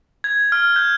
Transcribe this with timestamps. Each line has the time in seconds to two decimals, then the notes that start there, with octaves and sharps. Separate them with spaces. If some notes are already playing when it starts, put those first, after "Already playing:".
0.24 G#6
0.52 F6
0.76 G6